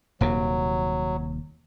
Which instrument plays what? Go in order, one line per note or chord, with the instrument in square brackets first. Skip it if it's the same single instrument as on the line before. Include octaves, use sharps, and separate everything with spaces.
[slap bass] D#1 D#2 C3 [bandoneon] F#3